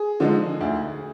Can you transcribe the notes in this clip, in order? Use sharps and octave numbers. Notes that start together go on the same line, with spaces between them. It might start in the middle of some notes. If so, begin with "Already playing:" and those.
Already playing: G#4
D3 F3 G#3 D#4
D2